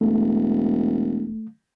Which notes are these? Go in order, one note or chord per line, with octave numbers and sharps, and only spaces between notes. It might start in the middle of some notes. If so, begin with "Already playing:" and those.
E1 A3